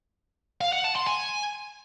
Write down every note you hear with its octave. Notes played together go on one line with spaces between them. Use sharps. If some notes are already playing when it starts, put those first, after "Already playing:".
F5
F#5
A5
C6
G#5